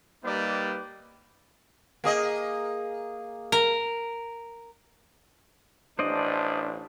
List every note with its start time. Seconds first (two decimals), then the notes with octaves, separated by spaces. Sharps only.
0.24 G3 A#3 D#4 G4 B4 D5
2.04 A#3 G#4 D#5
3.52 A#4
5.99 A1 D4 C5 D5 D#5